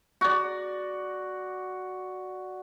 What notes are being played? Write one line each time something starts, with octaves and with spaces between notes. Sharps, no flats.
F#4 D5